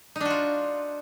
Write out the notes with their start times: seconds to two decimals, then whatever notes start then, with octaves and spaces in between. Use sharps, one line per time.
0.16 D#4
0.21 D4
0.25 F#4
0.30 F4